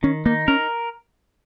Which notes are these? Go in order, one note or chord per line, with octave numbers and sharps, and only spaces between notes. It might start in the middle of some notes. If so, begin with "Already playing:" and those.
D#3 C#4
A#3 D#4
C#4 A#4